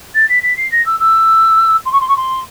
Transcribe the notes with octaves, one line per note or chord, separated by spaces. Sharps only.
A6
B6
B6
C7
A#6
E6
E6
C6
C#6
C6
C#6
C6